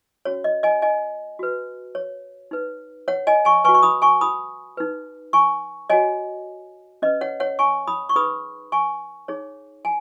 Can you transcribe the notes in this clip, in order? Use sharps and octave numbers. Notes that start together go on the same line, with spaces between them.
C#4 F#4 C#5
D#5
D#5 G#5
D#5 G#5
F#4 B4
C#5
D#4 B4
C#5 F#5
D#5 G#5
G#5 C#6
F#4 B4 G#5 C#6
C#6
B5 D#6
G#5 C#6
B5 D#6
D#4 B4
G#5 C#6
F#4 C#5 D#5 G#5
C#4 B4 D#5
C#5 F#5
C#5 F#5
G#5 C#6
B5 D#6
C#6
D#4 G#4 B4 B5 D#6
G#5 C#6
D#4 G#4 C#5
G#5